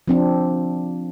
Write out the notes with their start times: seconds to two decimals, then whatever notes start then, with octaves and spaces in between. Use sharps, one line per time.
0.08 F3 C4 D4